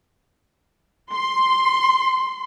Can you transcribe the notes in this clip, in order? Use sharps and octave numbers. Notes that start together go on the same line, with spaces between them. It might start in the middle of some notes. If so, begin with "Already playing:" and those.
C6